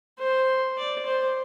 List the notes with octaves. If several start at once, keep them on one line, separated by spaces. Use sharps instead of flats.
C5
D5
C5